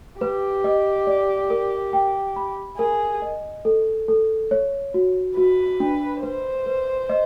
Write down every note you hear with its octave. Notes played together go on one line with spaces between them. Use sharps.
G4 B4
D#5
D5
A#4
G5
B5
G#4 A#4
D#5
A4
A4
C#5
F#4
F#4 B4
D4
B4 C5
B4
D#5